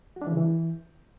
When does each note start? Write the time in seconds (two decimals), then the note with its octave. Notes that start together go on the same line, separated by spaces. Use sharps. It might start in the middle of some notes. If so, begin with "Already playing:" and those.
0.16 F#4
0.22 D4
0.27 E3
0.32 C#3
0.37 E3